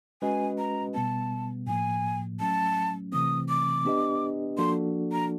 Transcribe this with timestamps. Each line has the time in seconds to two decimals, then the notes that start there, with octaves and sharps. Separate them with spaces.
0.22 G#3 C#4 F#4 B4 D#5 G#5
0.58 A#5
0.95 B2 G3 B3 A5
1.67 A2 F3 A#3 G#5
2.40 F#3 A3 C#4 A5
3.12 C3 E3 A3 C4 D#6
3.49 D6
3.85 B3 D4 G4 B4 D#5
4.58 F3 A#3 D4 F#4 A4 C6
5.12 A#5